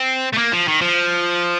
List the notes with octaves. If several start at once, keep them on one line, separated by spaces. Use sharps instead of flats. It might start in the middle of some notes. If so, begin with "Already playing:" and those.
Already playing: C4
A3
A#3
F3
D#3
F3